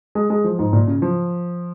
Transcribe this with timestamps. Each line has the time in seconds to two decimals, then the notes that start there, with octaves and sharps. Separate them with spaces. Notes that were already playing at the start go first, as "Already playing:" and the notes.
0.15 G#3
0.30 G#3
0.44 F3
0.59 G#2
0.73 A#2
0.87 C#3
1.02 F3